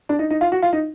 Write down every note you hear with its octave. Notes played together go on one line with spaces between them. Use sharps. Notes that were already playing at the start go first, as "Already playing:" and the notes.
D4
D#4
D#4
F4
F#4
F4
D#4